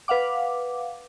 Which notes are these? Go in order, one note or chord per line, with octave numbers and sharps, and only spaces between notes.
B4 F5 F#5 D6